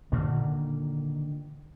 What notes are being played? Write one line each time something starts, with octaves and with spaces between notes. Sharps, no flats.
A#2 D3 D#3 A#3